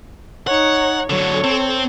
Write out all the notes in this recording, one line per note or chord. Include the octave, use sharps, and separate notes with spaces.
D#4 C#5 F#5
D3 F#3 A4 C#5
C4